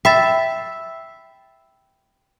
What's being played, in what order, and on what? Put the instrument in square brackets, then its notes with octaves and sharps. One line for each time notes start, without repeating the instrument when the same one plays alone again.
[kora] E5 [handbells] G5 B5 A6